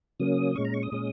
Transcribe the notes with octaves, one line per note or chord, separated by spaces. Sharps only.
C#3 F#3 A#3 C#4 D#6
A#2 G#3 C#4 C#6
A#5
C#6
D#6
A#2 G#3 C#4